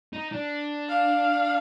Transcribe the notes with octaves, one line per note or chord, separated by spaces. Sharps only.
D#4
D4
F5